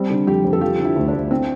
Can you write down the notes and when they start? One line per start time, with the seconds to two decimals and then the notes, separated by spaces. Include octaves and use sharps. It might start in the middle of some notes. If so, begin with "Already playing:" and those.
Already playing: G3 C4
0.10 D3
0.27 F2 G4
0.45 F2
0.53 A4
0.61 F3 G4
0.79 D3
0.85 E4
0.96 D2
1.08 D4
1.13 D2
1.31 C4 D4